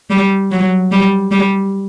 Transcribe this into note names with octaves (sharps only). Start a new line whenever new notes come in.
G3
F#3
G3
G3